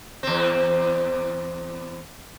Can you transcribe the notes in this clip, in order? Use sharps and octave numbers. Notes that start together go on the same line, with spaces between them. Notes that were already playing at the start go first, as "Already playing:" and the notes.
E2 C4